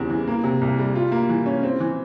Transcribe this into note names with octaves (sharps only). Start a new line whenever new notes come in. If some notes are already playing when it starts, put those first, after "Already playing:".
Already playing: E2 C#3 G3 C4
E3
A#3
C3
C2
G3
F4
A#3
E3
C#4
C4
E3